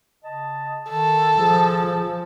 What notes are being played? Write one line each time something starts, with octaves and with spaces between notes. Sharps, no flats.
C#3 D#5 A5
D#3 A4
F3 G#4